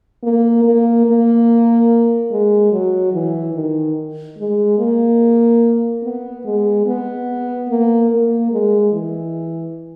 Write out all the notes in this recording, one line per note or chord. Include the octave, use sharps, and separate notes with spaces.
A#3
A#3
A#3
G#3
F#3
E3
D#3
G#3
A#3
B3
G#3
B3
A#3
A#3
G#3
E3